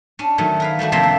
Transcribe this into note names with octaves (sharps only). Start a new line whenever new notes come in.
C#4 D4
D#3 F#3 A3 C#4
A#4 B4 F5
G3 A3 D4 F#4
F2 C3 A3 A#3 C4 E5
A#3